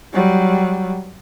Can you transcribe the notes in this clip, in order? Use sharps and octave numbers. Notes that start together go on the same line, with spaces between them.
F#3 G3